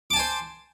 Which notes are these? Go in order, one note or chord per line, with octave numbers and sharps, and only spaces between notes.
C5 G#5 A5 D6